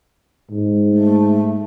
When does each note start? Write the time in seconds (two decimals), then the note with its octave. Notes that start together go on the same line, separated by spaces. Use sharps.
0.51 G#2
0.92 A3